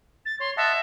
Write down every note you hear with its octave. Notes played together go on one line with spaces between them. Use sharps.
A6
C#5 C6
D#5 E5 F#5 A5